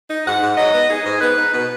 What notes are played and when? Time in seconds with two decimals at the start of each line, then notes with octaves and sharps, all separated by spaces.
0.10 D#4
0.25 G#2 F#5
0.42 G#2
0.57 F#3 D#5
0.74 B3
0.89 D#4 G#4
1.05 G#2
1.21 B3 B4
1.37 D#4
1.53 B2 B4